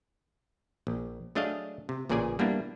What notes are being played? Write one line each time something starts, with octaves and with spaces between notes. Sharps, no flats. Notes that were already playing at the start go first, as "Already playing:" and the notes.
A#1
F#3 A3 D4 G#4 D#5 F5
C3
A1 A#2 C#3 G#4 D5 G#5
G3 A#3 B3 D4 E4